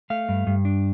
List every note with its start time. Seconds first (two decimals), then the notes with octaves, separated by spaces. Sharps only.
0.10 A3 F5
0.29 G2
0.47 G2
0.65 D4